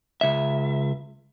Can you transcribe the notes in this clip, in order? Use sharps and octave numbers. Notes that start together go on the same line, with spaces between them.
C#2 E5